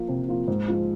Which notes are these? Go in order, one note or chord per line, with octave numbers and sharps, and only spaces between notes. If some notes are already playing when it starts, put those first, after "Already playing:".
Already playing: F3 A#3 F4
C3
F3 A#3 F4
G#2
F3 G#3